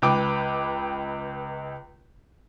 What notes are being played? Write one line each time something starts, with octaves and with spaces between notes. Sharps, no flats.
C#2 B4 G5 D6